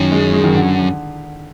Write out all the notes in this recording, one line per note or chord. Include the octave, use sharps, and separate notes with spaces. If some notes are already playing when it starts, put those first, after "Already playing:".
Already playing: F#2 D#3
G#3
G#3
D#3
D3